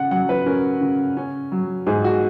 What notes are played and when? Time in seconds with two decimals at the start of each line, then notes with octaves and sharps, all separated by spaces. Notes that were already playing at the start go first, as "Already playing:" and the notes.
Already playing: C#3 F#5
0.11 F#3 F#5
0.29 B4
0.46 C#4 A#4
0.81 C#3
1.17 C#4
1.52 F#3
1.87 G#2 G#4
2.04 F#4